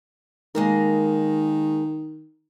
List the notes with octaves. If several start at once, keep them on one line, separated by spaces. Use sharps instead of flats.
D#3 G#3 A#3 A#4